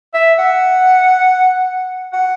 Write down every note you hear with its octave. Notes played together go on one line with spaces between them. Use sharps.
E5
F#5
F#5